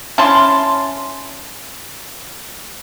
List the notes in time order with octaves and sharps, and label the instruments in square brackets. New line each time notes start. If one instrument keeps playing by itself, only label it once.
[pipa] C#4 E4 A5 C6